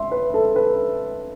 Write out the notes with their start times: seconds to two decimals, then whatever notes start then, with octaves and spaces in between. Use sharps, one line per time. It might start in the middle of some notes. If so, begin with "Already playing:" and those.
Already playing: E5 C6
0.12 B4
0.34 A4
0.56 B4